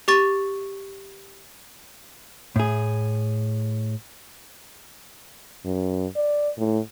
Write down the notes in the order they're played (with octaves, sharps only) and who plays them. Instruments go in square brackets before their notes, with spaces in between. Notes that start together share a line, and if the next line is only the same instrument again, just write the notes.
[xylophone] G4 C#6 A6
[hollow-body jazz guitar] A2 G#4
[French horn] F#2
D5
A2